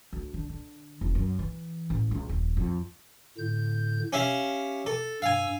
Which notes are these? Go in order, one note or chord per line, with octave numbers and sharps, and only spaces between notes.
D2
D3
D3
F1
F#2
E3
A1
C#2
D#1
F2
A2 D3 G6
C#4 G4 E5 F5
A4
G2 F5 G#5 E6